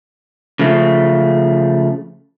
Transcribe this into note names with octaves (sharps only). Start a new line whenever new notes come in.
C#3 F3 A3